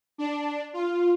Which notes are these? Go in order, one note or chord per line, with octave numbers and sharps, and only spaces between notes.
D4
F4